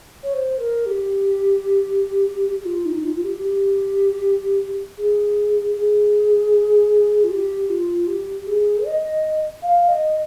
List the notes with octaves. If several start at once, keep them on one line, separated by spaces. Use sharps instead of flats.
C#5
C5
A#4
G4
G4
F4
D#4
D#4
F4
F4
G4
G4
G#4
G#4
F4
G4
F4
G4
G#4
D#5
F5
D#5